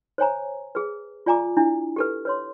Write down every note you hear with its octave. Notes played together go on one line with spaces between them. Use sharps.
C5 C#5 G#5 A#5
G#4 B4
F4 D5 G#5 A#5 D6
D4 E4
G4 A4 B4
B4 C#5 C6